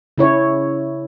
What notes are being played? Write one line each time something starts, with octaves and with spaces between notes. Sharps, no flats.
C#3 E4 C#5